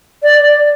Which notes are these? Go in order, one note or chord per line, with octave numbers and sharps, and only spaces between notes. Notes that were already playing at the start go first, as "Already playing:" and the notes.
D5